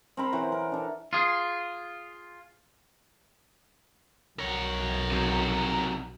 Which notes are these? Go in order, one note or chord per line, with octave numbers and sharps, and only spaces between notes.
C4 A#4 B5 C6
E3 C5 C#5 F#5
A#4
D4 A4
F4 G#4
B1 A#4 C#5
C3 F#3